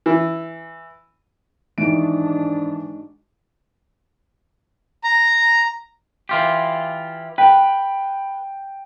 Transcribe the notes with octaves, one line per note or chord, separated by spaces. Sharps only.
E3
G#2 D#3 E3 G#3 D4 D#4 F#4 D7
A#5
E3 F4 G4
B4 G5